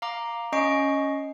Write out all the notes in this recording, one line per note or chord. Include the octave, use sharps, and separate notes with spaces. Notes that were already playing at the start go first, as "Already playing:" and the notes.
F5 A#5 D6
C#4 D#5 C#6 C7 D7